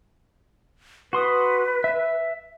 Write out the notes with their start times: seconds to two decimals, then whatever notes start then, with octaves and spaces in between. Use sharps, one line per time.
1.13 F#4 B4 C6 D#6
1.84 E5